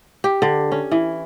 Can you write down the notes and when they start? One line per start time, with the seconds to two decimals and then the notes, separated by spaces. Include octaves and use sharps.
0.24 G4
0.42 D3
0.72 C#4
0.91 E3